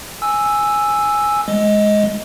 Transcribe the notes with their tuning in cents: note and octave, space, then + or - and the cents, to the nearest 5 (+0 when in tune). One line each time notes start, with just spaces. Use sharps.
G#5 +0 E6 +0
G#3 +10 D#5 +15